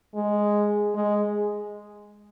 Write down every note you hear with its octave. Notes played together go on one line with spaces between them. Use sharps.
G#3
G#3